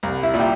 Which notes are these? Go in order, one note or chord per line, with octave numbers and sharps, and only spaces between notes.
C2
E4
A#2 G3
G4